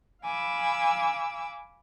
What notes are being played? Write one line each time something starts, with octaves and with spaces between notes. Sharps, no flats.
F5 G#5 B5 D6 E6